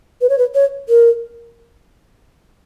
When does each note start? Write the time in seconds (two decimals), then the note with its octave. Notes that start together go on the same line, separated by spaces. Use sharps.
0.21 B4
0.29 C#5
0.38 B4
0.55 C#5
0.89 A#4